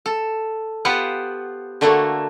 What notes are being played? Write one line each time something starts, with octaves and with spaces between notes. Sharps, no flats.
A4
B3 F4 G4 B4 C5 F#5
D3 A3 A#3 F#4 A4